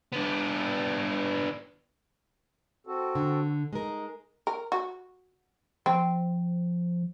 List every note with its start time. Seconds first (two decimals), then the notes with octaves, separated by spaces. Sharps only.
0.12 B3 D4
2.87 C4 F#4 A4
3.15 D3
3.73 G#3 D#4 A#4
4.47 A#4
4.72 F#4
5.86 F3 C4